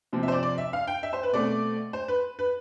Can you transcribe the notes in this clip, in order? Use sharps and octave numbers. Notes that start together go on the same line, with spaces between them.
C3 F3 C4
E5
C5
D5
D5
E5
F5
G5
E5
C5
B4
B2 A3 C4 D5
C5
B4
B4